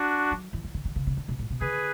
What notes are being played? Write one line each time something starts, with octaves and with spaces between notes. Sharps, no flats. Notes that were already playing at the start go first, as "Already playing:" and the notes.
Already playing: D4 F#4
F#3
E3
E3
D3
D3
C#3
C#3
D3
B2
A2
B2
D3 G#4 B4